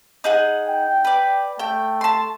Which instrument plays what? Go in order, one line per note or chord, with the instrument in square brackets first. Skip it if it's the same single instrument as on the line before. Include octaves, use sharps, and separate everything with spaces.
[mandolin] D#4 G#4 F#5
[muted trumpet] G5
[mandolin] B4 D5
[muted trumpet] A3 [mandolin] G5
[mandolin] A5 C6